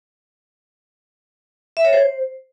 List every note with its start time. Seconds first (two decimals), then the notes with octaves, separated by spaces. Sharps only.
1.77 E5
1.85 C#5
1.93 C5